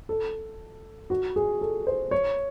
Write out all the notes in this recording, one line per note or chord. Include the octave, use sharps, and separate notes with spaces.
A4
F#4
G#4
A4
C5
C#5